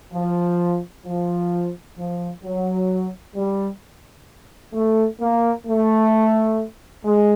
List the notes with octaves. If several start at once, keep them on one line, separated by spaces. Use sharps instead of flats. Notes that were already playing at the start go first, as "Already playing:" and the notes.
F3
F3
F3
F#3
G3
A3
A#3
A3
G#3